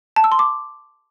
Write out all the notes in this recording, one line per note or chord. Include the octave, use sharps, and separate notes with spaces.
A5
E6
C6
D6